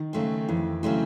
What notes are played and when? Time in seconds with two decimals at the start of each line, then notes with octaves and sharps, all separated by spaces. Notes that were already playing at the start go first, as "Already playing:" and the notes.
Already playing: D#3
0.13 C#3 F#3 A3 C4
0.49 F2 E3
0.83 C#3 E3 F#3 A3 C4